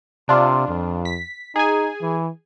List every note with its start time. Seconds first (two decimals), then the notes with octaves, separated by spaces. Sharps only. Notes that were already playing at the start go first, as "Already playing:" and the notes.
0.29 C3 D4 F4
0.68 F2
1.05 B6
1.56 D#4 G#4 G#5
2.01 E3